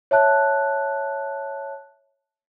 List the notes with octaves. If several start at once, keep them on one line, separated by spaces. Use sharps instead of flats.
C#5 E5 A5 F#6